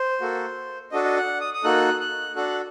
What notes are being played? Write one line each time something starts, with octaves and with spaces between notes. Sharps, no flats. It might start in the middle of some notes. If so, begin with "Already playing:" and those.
Already playing: C5
A#3 F#4 A4
D4 F#4 A4 D#5
D#5
F#5
D#6
D#6
A#3 D#4 F#4 A4 F#6
F#6
D4 F#4 A4 F#6